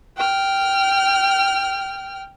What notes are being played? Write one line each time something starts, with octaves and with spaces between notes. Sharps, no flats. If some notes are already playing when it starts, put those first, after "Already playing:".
G5 F6